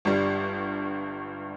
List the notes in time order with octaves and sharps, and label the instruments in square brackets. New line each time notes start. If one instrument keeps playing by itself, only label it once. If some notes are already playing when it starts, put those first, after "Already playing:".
[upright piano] G1 G2 G3